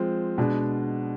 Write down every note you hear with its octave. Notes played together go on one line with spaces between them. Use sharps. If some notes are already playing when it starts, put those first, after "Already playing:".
Already playing: F3 G#3 C4
B2 G#3 D4